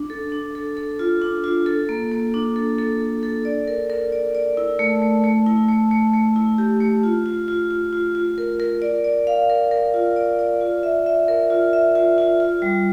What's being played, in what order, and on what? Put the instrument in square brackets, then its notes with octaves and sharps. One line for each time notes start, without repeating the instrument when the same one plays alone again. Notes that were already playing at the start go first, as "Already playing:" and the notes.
Already playing: [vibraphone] D4
A4
D4
A4
A4
F4
D4
F4
A4
A#3
A#3
D4
A4
A4
A4
A4
D5
A#4
A#4
D5
D5
E4
A3
A3
A3
E4
A3
A3
A3
E4
G4
A3
F4
F4
F4
F4
F4
F4
A#4
A#4
D5
D5
F5
A#4
A#4
F4
D5
D5
F4
E5
E5
A#4
F4
E5
F4
F4
F4
G3